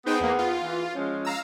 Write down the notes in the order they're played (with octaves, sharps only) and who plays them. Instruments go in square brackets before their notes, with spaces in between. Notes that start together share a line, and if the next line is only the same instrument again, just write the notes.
[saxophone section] B3 G#4 [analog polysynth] D#4 C5 G5
[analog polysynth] E2 A#3
F4
[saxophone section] E3
F3 G#3 C#4
[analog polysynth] F5 A#5 E6